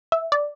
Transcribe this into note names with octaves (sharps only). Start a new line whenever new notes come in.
E5
D5